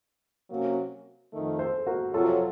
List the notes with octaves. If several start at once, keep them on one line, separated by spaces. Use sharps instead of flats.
C3 F#3 A#3 C#4 F#4
F2 D#3 A3
A4 C5
F#4 A#4
F2 C3 F#3 F4 A4